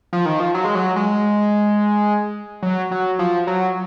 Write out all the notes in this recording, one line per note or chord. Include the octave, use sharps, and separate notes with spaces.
F3
D#3
F3
F#3
G#3
F#3
G#3
F#3
F#3
F3
F#3